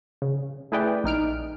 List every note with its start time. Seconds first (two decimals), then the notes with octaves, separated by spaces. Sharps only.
0.22 C#3
0.72 A3 E4 G#4 B4 D5 G5
1.04 A#1 D#4 F6 D7